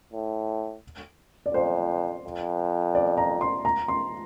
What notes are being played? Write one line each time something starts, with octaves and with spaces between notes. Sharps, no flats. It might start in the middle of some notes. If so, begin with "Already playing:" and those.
A2
D5
F2 C5
F2
D5
A#5
C6
A#5
C6